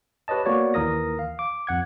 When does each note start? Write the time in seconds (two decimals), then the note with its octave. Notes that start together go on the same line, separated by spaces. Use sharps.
0.28 G4 B4 C#5 D#5 A5
0.45 A#3 B3 F#4 C#5 D5
0.74 D#2 E3 A#4 D#6 A#6
1.19 F5
1.39 D6
1.67 F2 F#5 G#6